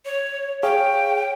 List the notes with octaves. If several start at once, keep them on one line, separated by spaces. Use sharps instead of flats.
C#5
G#4 C#5 F5 G5